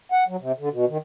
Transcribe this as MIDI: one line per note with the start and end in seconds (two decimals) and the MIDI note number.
0.12 0.24 78
0.28 0.36 54
0.40 0.52 48
0.59 0.69 50
0.72 0.85 47
0.89 0.98 51